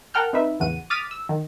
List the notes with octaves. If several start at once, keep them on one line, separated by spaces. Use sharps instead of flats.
A#4 F#5 G5 A5 F6 G6
C4 D#4 B4 E5
A1 E2 C#3 E3 F#5 D#7
D6 D#6 F6 A6 B6 D#7
E6
D#3